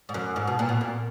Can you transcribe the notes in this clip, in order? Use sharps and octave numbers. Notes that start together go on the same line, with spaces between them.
G#2
F#2
G#2
B2
A#2
B2
A#2